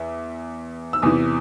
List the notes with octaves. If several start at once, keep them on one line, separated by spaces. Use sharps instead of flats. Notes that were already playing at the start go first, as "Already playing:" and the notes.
Already playing: E2 E5
E6
E2 C3 E3 D#6